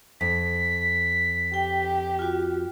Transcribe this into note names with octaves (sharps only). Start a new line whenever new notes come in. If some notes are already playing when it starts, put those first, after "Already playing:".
F2 B6
G4 G5
F4 F#4